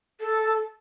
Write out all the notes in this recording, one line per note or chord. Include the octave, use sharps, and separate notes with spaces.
A4